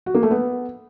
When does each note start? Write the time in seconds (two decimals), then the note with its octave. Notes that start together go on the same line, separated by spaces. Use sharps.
0.06 F#4
0.15 A#3
0.23 A3
0.31 B3